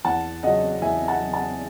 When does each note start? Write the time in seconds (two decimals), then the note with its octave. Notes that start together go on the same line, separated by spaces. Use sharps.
0.05 E2 F#5 A5
0.43 C#3 F#3 D#5 F#5
0.82 E2 E5 G#5
1.08 F#5 A5
1.20 C#3 F#3
1.33 F#5 A5